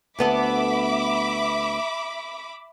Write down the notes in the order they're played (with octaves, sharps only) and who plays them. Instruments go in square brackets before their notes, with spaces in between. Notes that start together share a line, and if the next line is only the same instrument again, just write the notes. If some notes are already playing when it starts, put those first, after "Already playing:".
[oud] D2 B3 A4 [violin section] E5 B5 D6